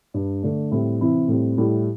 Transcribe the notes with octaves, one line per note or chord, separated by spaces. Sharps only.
G2 G3 D4
D3 A3 D4
A2 G3 C4 E4
C3 E3 C4 E4
A2 G3 C4
A2 G3 E4